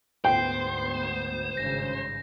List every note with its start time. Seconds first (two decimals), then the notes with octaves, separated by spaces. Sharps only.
0.25 D2 G#2 B3 C5 G5 G6 C7
1.57 G#1 G2 C#3 A#6